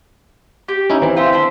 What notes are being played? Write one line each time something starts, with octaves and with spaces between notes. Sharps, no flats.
G4
C#4 D#4 E4
E3 C4
F4 C5 E5
D4 C5 B5